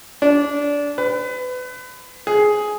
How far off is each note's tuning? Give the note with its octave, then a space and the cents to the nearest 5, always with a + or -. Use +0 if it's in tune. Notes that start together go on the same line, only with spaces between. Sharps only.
D4 -20
B4 +30
G#4 +10